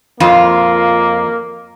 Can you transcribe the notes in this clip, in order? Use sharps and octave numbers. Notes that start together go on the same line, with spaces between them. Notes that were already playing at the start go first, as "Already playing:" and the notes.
F2 A#3 F4